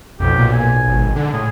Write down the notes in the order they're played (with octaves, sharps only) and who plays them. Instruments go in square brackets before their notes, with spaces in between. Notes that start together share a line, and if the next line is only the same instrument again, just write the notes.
[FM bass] B1 [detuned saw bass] F2 [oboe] G4
[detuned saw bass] A#2
[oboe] G#5
[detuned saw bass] G#1
D3
[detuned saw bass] A2 [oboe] G#4